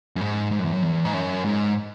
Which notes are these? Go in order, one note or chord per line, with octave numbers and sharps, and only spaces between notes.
F#2
G#2
G#2
F#2
E2
F#2
E2
G#2
F#2
G#2